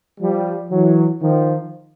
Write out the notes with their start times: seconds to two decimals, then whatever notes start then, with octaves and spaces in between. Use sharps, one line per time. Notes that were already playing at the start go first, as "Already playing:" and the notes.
0.21 F3 G3
0.71 E3 F#3
1.22 D#3 F3